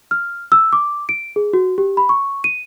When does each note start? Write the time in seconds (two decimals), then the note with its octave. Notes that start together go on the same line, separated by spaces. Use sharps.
0.11 F6
0.52 E6
0.73 D6
1.09 D7
1.36 G#4
1.53 F#4
1.78 G4
1.97 B5
2.09 C#6
2.44 D#7